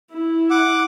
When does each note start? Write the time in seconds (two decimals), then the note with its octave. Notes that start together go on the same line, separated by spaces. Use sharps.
0.12 E4
0.50 F#5 D6